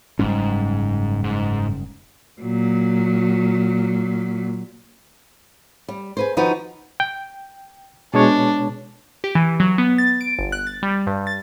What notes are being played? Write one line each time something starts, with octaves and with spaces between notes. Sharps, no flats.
F#1 G#2 G3 C#4
G#2
A#2 F#3
G3
G#4 B4 C5
D#3 F3 D#4 F#4 B4
G5
B2 G#3 D4 C#5
G4
E3
F#3
B3
A6
D7
G1
F#6
A6
G3
G2
A6